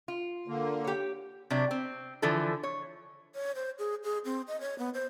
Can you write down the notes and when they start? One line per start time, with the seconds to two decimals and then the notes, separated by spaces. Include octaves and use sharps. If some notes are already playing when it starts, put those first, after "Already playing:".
0.08 F4
0.48 D3 A#3
0.84 G4 C#5
1.50 C3 F#3 D4
1.71 C4
2.22 D3 E3 F3 A4
2.63 C#5
3.35 C#5
3.55 C5
3.79 G#4
4.04 G#4
4.25 C4
4.48 D#5
4.61 C#5
4.79 B3
4.94 C5